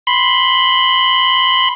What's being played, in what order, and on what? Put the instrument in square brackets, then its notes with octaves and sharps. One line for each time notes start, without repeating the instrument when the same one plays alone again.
[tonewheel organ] B5 C6